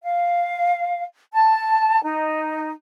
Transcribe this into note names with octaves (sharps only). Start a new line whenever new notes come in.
F5
A5
D#4